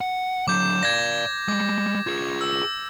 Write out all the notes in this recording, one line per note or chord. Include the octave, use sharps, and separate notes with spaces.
F#5
D3 F#3 D6 G6
D5 F5 G#6 A#6
G3 G#3 D6
F4 G#4 G#6
E6